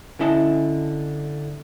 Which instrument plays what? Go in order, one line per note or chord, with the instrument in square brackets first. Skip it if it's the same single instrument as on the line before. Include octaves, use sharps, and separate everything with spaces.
[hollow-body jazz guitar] D3 C#4 E4 D#5 A5